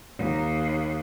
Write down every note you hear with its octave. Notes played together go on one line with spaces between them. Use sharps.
D#2